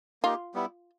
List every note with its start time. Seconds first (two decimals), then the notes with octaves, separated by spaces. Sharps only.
0.23 A#3 D#4 F4 G4
0.54 G3 B3 E4